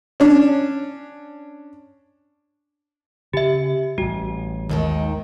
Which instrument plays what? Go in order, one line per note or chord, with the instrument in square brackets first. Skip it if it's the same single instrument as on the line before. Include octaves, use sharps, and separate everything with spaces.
[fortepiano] C#4 D4
[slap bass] C#3 [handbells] G4 E5
[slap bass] A1 G3 [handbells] F#4
[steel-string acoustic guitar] D#2 G#2 D#3